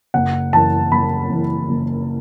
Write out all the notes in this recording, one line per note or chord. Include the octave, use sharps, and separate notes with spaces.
F#1 F#5
F#2 E3 A5
F#1 B5
F#2 E3
F#1